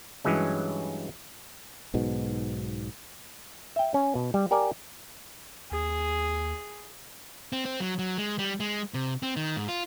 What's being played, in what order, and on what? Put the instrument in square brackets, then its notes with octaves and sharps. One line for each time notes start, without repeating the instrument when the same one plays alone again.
[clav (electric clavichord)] G2 E3 F#3 G#3 C#4
[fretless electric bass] B1 G#2 B2
[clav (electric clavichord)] E5 G5
C#4
B2
G3
G4 A#4 D5 G#5
[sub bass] D#2 [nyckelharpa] G#4
[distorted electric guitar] C4
C4
F#3
F#3
G#3
G3
G#3
C3
C4
D#3
G#2
F4